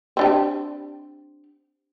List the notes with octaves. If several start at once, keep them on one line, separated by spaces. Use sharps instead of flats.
C4 D4 G4